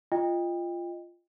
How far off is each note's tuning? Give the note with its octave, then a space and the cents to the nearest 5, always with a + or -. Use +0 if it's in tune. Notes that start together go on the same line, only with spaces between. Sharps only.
F4 -10 D#5 +0 G5 +30